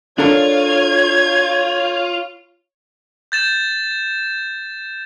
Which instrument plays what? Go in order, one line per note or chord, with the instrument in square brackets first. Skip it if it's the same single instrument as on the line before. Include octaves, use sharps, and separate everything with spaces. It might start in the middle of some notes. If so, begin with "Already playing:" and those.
[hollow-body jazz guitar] D4 A4 A#4 [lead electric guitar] F4 [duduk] C#5 [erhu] G#6
[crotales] G6 A6 E7